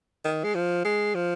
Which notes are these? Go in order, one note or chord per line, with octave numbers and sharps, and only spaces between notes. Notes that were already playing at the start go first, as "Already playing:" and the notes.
D#3
G#3
F3
G#3
F3